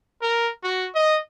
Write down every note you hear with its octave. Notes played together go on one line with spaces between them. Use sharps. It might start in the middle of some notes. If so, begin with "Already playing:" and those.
A#4
F#4
D#5